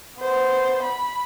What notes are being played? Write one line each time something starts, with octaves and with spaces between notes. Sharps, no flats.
B3 C5
B5